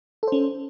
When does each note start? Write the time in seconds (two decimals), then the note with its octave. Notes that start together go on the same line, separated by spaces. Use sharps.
0.23 A4
0.28 C5
0.32 C#4